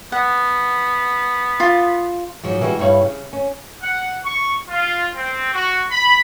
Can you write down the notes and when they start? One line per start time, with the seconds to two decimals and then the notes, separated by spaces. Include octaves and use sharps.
0.12 B3 F#5
1.60 F4 D6
2.43 G#2 F3 F#3
2.60 C#3 E3 G3 G#3 F#4
2.79 G2 E4 C#5 F5
3.01 C#3
3.33 C#4
3.82 F#5
4.24 C#6
4.69 F4
5.14 C4
5.53 F#4
5.92 B5